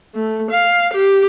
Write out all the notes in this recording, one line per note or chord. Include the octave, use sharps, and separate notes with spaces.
A3
F5
G4